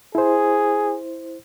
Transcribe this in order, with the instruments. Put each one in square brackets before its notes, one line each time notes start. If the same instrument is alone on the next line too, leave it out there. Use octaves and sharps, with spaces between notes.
[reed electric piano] E4 C5 [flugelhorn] G#4